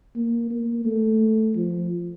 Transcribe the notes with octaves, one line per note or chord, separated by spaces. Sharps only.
A#3
A#3
A3
F3